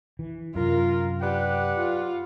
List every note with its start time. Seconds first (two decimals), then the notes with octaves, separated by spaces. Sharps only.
0.19 E3
0.55 F#2 C3 F4 A#4
1.21 G4 B4 D5 F#5
1.77 F4